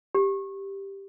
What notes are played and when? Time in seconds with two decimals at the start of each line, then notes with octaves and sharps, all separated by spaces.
0.15 G4